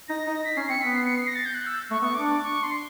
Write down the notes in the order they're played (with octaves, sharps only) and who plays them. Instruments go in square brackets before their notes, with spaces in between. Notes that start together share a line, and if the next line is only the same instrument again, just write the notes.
[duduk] D#4 [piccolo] A#6
[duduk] D#4
[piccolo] B6
[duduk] C#4 [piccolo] C7
[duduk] C4 [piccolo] C#7
[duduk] B3 [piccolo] B6
[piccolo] C7
C#7
C7
A#6
A6
G6
F#6
E6
[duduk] A3 [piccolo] C#6
[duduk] B3 [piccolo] C#6
[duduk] D4 [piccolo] D6
[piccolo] D6
C#6
C6